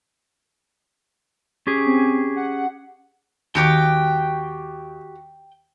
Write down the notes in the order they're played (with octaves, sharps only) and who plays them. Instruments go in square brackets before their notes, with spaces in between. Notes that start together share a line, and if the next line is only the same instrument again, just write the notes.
[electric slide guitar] C#4 G4 G#4
[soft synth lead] C4
F#5
[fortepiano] D#2 [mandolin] F#4 G4 D6 [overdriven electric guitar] G5